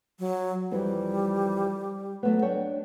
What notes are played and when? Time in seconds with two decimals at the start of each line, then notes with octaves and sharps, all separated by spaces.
0.19 F#3
0.72 F2 E3 G3
2.23 F#3 A3 B3
2.42 D4 C#5 G5